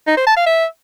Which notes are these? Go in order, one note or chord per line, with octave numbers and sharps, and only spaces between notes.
D#4
C5
A5
F5
E5